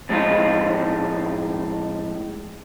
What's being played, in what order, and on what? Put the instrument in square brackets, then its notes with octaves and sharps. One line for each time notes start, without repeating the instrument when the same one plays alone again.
[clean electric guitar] F2 A2 G#3 C#4 D#4 F4